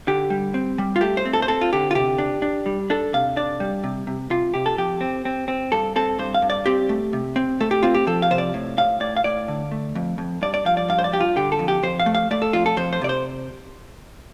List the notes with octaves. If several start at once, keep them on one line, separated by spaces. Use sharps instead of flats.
D3 G4
G3
C4
G3
F4
A3 G4
C5
C4
A4
C5
C4 A4
F4
D3 G4
F4
C3 G4
D4
D4
G3
D4 A4
C3 F5
D4 D5
G3
C3
C3
C3 F4
C3 G4
A4
F2 G4
C4
C4
C4
G2 A4
C4 A4
G2 C5
F5
G2
D5
C4 G4
A3
C3
C4
A3 A4
G4
C4 F4
G4
F3 A4
F5
C3 C5
D5
A2
A2 F5
A2 D5
F5
A2 D5
D3
A3
F2
F2
G2 D5
D5
F3 F5
D5
G2 F5
C5
D5
G2 G4
F4
D3 G4
A4
F2
G4
F2 C5
F5
A3
F5
A3 D5
A4
F2 F4
A4
F2 C5
C5
C3 D5
C5